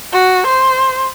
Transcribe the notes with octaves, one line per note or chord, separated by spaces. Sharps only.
F#4
C5